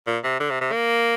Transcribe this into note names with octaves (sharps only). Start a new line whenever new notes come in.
A#2
C3
D3
C3
C3
A#3